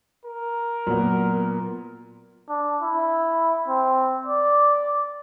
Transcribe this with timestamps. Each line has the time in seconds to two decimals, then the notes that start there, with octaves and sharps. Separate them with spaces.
0.25 A#4
0.87 A#2 F#3 B3
2.49 D4
2.82 E4
3.68 C4
4.27 D5